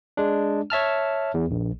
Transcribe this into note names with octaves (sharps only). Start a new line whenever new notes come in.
G#3 D4
C#5 E5 A5 F6
E2
A#1